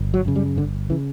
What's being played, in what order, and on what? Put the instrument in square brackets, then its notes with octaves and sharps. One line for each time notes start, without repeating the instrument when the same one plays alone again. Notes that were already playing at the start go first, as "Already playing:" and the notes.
Already playing: [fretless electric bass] G1
F#3
F#2 C#3
G3
G1 D3
C#3 E3